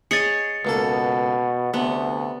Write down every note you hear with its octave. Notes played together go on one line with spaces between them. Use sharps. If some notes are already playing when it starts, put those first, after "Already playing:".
G#4 C#5 D#5 A6 C#7
C#2 B2 A#3 A4
D2 C3 B3